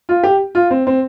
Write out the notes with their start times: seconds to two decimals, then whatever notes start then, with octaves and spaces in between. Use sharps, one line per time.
0.09 F4
0.23 G4
0.55 F4
0.71 C4
0.87 C4